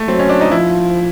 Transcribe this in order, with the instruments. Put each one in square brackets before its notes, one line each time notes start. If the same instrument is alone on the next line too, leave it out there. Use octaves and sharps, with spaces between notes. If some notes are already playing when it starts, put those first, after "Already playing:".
Already playing: [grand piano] A3
[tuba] F#3 [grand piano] C4
[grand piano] C#4
D4
D#4
[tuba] F3 [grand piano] E4